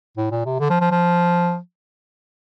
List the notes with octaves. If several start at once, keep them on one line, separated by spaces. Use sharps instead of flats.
A2
A#2
C3
D3
F3
F3
F3